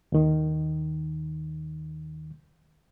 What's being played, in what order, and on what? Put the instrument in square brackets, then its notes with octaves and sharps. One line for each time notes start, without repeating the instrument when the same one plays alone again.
[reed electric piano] D#2 D#3